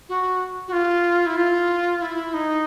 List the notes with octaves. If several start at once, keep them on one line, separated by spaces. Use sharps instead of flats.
F#4
F#4
F4
E4
F4
E4
D#4